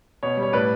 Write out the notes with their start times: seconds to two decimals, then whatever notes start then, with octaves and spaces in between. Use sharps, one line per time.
0.23 B2 C#5
0.37 G3
0.43 C#5
0.53 A2 B4 D5